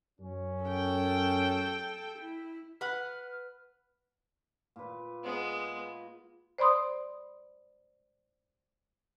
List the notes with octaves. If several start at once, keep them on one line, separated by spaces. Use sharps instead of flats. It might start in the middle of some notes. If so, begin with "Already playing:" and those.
F#2 C#4
A4 G5
E4
B4 F#5 F6
A#2 B4
G#3 B3
C5 D5 B5 C6 D#6